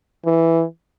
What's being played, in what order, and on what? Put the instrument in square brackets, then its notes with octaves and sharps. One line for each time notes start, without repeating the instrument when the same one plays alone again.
[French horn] E3